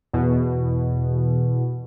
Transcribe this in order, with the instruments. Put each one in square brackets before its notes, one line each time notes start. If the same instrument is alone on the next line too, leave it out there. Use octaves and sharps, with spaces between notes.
[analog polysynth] E2 B2